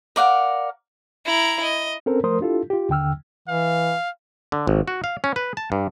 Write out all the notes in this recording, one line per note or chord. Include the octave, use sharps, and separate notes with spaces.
A#4 D5 F5 F#5
E4 A#5
D#5
C4 C#4 A4 A#4 C5
F3 A3 A#4 C5 C6 D#6
D4 E4 F4 G4 A4
F4 G4
D#2 D3 G5 E6 F6
E3 F5
D3
G#1
F#4
F5
C#4
B4
A5
G2